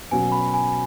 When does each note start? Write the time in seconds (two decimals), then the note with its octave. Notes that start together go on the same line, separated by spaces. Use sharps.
0.11 B2 F#3 C#4 F#4 G#5
0.32 B5
0.54 G#5